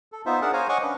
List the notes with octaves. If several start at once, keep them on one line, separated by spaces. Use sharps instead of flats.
A4
B3 D#4 F4 C5 E5
D4 G#4 A#4 F#5 A5
C5 C#5 F5 G#5 A#5
C#5 D#5 F#5 G#5 C#6 D6
C#4 D4 B4